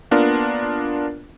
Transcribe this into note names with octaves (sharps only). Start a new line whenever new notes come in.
A#3 B3 D4 F4 A#4